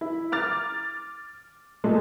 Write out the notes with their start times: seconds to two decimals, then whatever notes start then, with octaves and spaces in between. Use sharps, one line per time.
0.01 E4
0.32 D6 F6 A6
1.84 A#2 G#3 A3